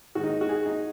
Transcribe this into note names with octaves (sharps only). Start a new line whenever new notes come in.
G#2 D#3 G#3 F#4
D#4
F#4
G#4
D#4